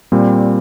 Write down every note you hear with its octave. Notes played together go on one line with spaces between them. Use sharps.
A#2 G3 C4